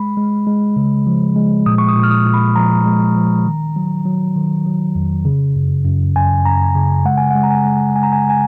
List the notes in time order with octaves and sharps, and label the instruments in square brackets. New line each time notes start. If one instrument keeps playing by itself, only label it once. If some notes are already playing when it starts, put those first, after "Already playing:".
Already playing: [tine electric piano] G#3 B5
G#3
G#3
C#3
F3
G#3
A#2 D#6
C#6
D#6
A#2
F6
D#6
A#2
B5
F3 A#5
G#3
F3
D#3
F#3
F#3
D#3
F#3
F2
C#3
F#2
F#2
F#2 G#5
F#2 A#5
C#3
G#3 F#5
G#5
F#5
G#3
A#5
G#5
G#3
G#3 G#5
A#5
G#5
G#5